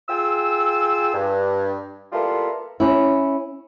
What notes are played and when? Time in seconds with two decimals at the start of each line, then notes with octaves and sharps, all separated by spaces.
0.09 F4 G#4 G5 E6
1.14 G2
2.12 G3 A#3 B3 E4 F4 A4
2.80 C#4 E4